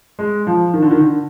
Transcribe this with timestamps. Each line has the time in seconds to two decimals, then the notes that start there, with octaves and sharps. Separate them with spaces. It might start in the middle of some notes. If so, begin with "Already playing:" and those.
0.19 G#3
0.47 F3
0.74 D#3
0.82 D3
0.91 D#3
1.01 D3